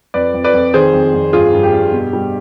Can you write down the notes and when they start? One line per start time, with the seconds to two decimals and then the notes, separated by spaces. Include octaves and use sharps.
0.14 F2 B4 D5
0.34 F2
0.44 B4 D5
0.54 F2
0.74 D#3 G#4 C5
0.93 F2
1.14 F2
1.33 G2 F4 G#4
1.53 G2
1.63 G4
1.72 G2
1.92 B2
2.13 G3